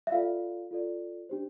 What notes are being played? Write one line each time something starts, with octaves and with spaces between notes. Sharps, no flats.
E5
F4 A4 D5 F5
F4 A4 D5
D4 G4 C5